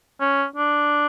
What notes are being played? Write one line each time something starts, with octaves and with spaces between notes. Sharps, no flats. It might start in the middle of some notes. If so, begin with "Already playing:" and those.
C#4
D4